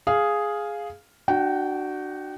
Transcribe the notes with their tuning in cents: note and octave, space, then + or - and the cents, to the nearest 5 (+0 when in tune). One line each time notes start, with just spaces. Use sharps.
G#4 +0 F5 +0
D4 +30 F#4 +10 G5 -20